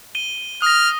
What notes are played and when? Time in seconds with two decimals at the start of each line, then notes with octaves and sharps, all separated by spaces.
0.15 D#7 G7
0.62 D#6 F6 A#6